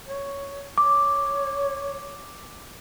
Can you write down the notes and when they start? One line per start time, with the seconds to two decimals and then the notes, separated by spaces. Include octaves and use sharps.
0.07 C#5
0.78 C#5 D6